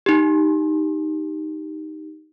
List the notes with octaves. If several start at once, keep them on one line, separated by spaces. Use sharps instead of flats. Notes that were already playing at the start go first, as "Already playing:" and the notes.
D#4 G4